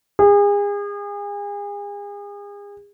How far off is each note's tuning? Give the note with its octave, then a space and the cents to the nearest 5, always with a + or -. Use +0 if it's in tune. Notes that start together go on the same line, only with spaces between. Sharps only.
G#4 -35